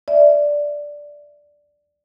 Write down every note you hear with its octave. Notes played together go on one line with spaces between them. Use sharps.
D5 E5